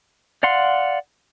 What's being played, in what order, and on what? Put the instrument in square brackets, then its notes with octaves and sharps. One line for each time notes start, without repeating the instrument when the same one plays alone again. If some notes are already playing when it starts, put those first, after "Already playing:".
[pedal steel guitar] D5 F5 F#5 C6